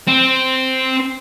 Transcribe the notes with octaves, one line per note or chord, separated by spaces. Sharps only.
C4